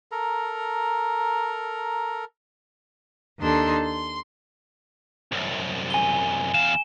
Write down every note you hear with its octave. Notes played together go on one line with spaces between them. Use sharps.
A4 A#4 A#5
D#2 D4 D#4 A4 C6
C6
C2 F#2
G#5 G7
E2 F5 E7